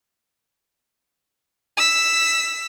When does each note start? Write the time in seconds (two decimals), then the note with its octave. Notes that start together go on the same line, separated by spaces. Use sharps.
1.77 E6 B6